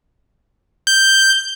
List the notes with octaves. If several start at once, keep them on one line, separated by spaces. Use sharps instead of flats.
G6